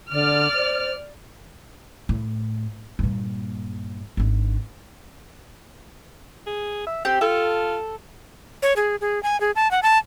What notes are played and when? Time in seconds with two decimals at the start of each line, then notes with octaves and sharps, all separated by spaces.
0.11 D3 D5 F6
0.54 C5
2.09 A2
2.99 G2 A#2
4.17 G#1 D4
6.47 G#4
6.86 E5
7.05 C4 G4
7.21 F4 A4
8.62 C#5
8.76 G#4
9.01 G#4
9.23 G#5
9.40 G#4
9.56 A5
9.71 F#5
9.83 A5